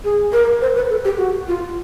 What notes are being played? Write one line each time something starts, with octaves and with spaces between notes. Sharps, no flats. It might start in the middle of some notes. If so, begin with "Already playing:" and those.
G#4
A#4
C5
B4
A4
G4
F#4
F4